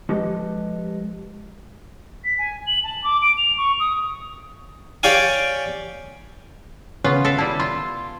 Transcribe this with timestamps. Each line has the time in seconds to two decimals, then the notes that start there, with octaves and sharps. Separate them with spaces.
0.09 F3 G#3 G4 A4 B4 D#5
2.25 B6
2.38 G#5
2.67 F#7
2.84 A5
3.04 D6
3.22 D7
3.38 F7
3.58 C#6
3.80 D#6
5.03 G4 C#5 D5 F5 G#5
7.04 C#3 B3 C#4 F4
7.25 A4 E5 F5
7.38 G3 E4 A5
7.60 F4 C6